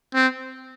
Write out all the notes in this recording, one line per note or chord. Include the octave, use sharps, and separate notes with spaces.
C4